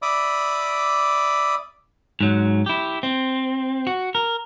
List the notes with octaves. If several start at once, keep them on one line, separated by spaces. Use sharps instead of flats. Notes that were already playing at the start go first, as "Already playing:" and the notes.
D5 E5 B5 D6 D#6
G#2 F#3
E4 G4
C4
F#4
A#4